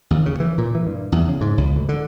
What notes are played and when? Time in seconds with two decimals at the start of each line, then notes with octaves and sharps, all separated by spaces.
0.11 D#2
0.26 C#3
0.40 E3
0.58 A#2
0.75 E3
0.87 G2
1.12 E2
1.29 C#3
1.41 G#2
1.58 C#2
1.76 D2
1.89 D3